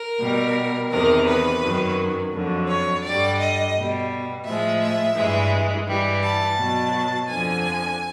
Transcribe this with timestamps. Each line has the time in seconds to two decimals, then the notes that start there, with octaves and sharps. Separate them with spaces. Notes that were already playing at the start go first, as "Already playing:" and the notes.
Already playing: A#4
0.20 B2 G3
0.90 E2 C3 D#3 A#4
1.26 B4
1.62 F#2 D#3 F#3
2.32 F2 D3 F#3
2.68 C#5
3.03 G2 D3 G3 D5
3.39 D#5
3.74 B2 G3
4.45 A2 F3 G#3 E5
4.80 E5
5.16 G2 E3 G#3
5.86 G2 E3 G3
6.22 A5
6.57 B2 F#3
7.28 F2 D3 F3 G#5